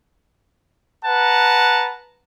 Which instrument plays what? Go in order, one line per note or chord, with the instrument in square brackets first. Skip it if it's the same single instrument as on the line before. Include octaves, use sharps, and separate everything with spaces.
[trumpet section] B4 F#5 A5 A#5